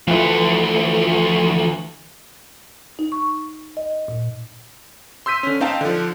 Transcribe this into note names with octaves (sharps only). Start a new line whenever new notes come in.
D2 E3 F3 A3
D#4
C#6
D#5
A#2
C6 E6 G6 B6 D#7
D3 C#4
C4 D#4 F5 G5 A5
D3 F3